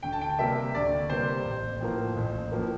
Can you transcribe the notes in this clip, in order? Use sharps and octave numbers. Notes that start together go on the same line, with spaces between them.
D2 G5
A5
G5
C3 G3 A#3 E5
D2 D5
C3 G3 A#3 C5
A1
A2 F3 A#3
A1
A2 F3 A#3